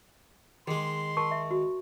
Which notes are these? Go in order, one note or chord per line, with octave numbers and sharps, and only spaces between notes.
D#3 G#3 G#4 C6
A#4 A5 C#6
E5
F#4